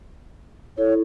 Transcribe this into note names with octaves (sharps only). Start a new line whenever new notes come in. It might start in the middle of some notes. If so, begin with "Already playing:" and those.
E4 A4 C#5